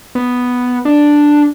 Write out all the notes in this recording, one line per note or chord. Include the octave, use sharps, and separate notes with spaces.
B3
D4